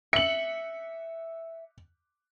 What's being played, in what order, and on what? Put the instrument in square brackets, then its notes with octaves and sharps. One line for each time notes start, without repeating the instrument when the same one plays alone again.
[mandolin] E5 [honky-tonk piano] C#7 F#7